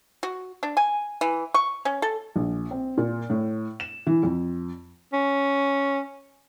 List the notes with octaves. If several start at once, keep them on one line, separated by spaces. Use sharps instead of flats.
F#4
D4
G#5
E3
C#6
C#4
A4
A#1
C4
A#2
A2
E7
E3
F2
C#4